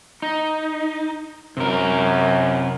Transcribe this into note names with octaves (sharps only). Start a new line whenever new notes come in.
D#4
F#2 C3 A#4